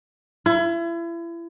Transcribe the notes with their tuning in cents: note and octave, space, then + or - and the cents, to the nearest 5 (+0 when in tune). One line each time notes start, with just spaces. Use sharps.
E4 +35